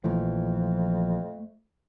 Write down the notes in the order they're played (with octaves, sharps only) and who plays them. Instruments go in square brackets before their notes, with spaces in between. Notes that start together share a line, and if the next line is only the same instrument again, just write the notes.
[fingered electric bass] A#1 E3 F3 [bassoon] F2 [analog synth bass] A3